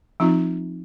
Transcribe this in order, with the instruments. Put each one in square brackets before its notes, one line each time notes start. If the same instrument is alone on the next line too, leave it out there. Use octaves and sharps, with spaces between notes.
[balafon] F3 C4 D#4 F4